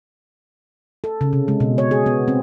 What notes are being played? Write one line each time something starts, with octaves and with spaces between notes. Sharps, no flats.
A4
C#3
C3
G#3
B2
C#5
G#4
B3
C4